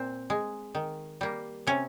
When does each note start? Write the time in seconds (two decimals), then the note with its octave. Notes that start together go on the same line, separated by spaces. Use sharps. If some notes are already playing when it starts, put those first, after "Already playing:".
Already playing: A#2 C4
0.30 G#3
0.75 D#3
1.21 G3 A#3
1.67 C3 C#4